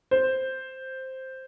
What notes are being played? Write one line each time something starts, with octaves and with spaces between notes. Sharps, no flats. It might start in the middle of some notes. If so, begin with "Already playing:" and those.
C5